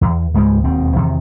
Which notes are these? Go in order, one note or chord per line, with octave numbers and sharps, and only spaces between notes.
E2
C#2 G#2 G3 G#3
E1 D#2 B2 C4
E2 C3 D#3